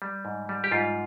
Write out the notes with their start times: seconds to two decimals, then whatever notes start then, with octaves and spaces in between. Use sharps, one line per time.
0.02 G3
0.25 G#2
0.49 G3
0.64 G4
0.71 G#2 F4